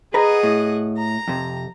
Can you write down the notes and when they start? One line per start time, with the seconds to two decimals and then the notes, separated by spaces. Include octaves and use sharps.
0.14 G#4 B4 D#5 F#5 A#5
0.43 A2
0.96 A#5
1.28 F2 C3